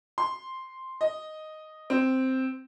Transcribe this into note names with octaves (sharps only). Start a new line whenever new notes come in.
C6
D#5
C4